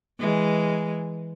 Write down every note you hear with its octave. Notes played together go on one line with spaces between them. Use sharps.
E3 G#3